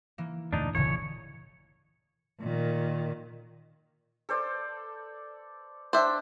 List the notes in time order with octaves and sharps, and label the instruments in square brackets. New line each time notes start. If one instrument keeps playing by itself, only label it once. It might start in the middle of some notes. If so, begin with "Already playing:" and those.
[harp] E3 A#3
[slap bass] D2 G2 A#2 [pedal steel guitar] D4 D#4
[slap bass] D1 G1 E2 [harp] A#2 C#3 E3 [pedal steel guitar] C#5
[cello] A#2 D#3
[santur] A4 C5 D5
[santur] D4 G5 A5 [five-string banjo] C5 E5